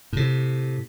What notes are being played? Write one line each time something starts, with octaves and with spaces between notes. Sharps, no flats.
A2 C3